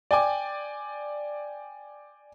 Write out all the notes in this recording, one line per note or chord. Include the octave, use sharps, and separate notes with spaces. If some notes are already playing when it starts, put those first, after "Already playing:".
D5 G5 G#5 D6